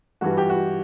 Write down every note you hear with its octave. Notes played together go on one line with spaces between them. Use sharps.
G2 E3 G3 F#4
G4
F#4